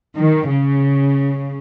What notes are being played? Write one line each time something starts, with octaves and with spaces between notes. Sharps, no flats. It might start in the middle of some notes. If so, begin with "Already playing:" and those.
D#3
C#3